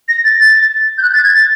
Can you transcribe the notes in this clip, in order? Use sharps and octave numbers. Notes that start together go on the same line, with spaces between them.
A#6
A6
A6
G6
F#6
A6
G#6
A6